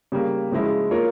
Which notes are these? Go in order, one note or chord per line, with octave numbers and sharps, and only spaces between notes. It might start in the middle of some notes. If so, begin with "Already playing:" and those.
C#3 G3 A#3
C#3 F3 G#3 E4
A#3 F4 A#4 C#5